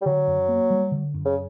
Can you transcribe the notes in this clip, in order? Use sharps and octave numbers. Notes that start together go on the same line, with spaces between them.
G3
D3 F#3
F#2
A#3
G3
D3
F#2
C#3